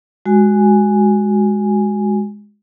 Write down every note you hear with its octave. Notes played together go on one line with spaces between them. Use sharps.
G#3 F#4 G#5